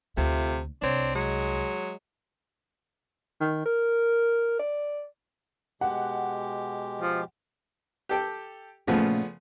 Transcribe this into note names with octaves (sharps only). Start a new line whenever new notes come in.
D2 C3 A3 F4
C2 C4 D4 C#5
F#3 G#3
D#3
A#4
D5
B2 G#3 G4 F#5
F3
G4 A4 G5
A#2 C#3 F3 A3 B3 C#4